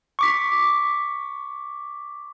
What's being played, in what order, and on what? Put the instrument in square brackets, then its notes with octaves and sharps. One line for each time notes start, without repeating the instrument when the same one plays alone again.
[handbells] C#6 D6 B6